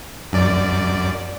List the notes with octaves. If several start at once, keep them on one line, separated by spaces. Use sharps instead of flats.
F#2 D5